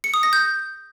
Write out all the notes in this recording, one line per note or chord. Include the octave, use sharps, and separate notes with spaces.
C#7
D#6
A#6
G6